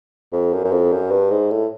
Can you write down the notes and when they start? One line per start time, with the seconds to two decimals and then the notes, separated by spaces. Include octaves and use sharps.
0.33 F2
0.53 F#2
0.64 F#2
0.72 F2
0.92 F#2
1.11 G2
1.31 G#2
1.51 A2